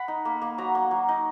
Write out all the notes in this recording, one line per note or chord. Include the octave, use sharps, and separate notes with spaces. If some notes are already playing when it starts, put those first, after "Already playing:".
Already playing: F#5 B5
D#4
A#3
A#3
F#3 A#5
A#3
F#3
D#4